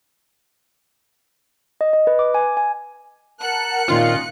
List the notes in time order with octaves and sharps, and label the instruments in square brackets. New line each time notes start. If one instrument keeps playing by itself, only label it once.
[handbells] D#5
D#5
B4
D6
G#5
G#5
[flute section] A#4 F#5 A5 [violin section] F#6 C#7
[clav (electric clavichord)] A#2 D#3 C4 [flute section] C#4 D#4 [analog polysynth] F4